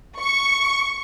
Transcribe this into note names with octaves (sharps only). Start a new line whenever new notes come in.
C#6